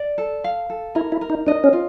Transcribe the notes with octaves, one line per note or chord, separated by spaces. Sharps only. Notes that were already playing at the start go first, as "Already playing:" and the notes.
Already playing: D5
A4
F5
A4
E4 A#4
E4
A#4
D#4
D4 D#5
C#4
F4